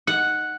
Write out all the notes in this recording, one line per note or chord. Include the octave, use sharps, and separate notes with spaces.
F#5